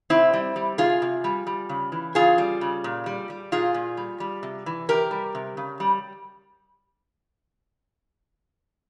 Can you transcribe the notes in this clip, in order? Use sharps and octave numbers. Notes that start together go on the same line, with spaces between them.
C3 C4 E4
G3
G3
C3 F4 G#4
C3
G3
G3
C#3
E3
C#3 F4 G#4
G3
C#3
A#2
G3
G3
A#2 F4 G#4
A#2
G3
G3
C3
E3
C3 G4 A#4
G3
C3
C#3
G3